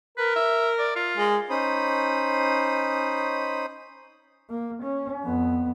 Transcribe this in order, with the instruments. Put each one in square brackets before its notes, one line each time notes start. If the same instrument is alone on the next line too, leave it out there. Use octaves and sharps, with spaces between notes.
[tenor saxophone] A#4 [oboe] B4
[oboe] E5
D5
F4
[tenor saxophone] G#3
[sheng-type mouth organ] C#4 D#4 C5 B5 D#6
[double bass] A#3
C#4
F2 B3